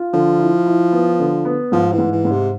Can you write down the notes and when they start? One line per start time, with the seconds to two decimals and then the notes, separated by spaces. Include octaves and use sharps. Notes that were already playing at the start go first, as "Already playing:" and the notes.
Already playing: F4
0.13 D3 F3
0.39 E4
0.66 E4
0.92 B3
1.19 D3
1.45 B3
1.72 G#2 F3
1.92 E3
1.98 G#2
2.12 E3
2.25 G#2
2.31 C3